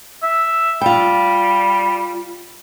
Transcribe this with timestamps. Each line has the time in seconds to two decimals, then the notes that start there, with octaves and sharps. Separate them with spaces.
0.23 E5
0.81 G3 F4 G5